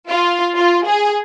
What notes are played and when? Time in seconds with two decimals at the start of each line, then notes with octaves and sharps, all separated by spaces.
0.10 F4
0.56 F4
0.87 G#4